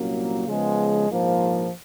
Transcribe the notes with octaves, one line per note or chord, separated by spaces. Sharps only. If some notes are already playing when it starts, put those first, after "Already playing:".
Already playing: C2 A#2 F#3 A#3 C#4
C#3 F3 G#3 B3
A#1 G#2 F3 A#3